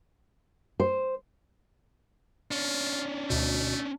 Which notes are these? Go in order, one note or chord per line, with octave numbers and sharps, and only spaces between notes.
C5
C#4 D4 F4
D2 B2 A3